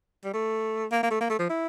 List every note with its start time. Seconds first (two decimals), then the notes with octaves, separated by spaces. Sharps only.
0.24 G3
0.33 A3
0.91 A#3
1.03 A#3
1.10 A3
1.20 A#3
1.30 A3
1.39 F3
1.49 E4